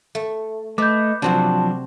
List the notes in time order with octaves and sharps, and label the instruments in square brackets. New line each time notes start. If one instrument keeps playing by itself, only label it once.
[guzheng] A3
[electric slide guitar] A3 [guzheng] B4 [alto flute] D#5 [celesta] D6 G6
[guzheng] C3 C4 F#4 [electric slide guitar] F3 F#3 D4 [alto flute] A5